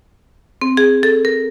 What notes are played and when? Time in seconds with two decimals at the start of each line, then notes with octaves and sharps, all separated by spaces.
0.61 C4
0.77 G#4
1.03 A4
1.25 A#4